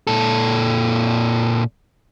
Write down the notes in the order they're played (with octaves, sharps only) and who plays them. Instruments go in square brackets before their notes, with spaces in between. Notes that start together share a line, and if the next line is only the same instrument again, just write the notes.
[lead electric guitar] A#2 A4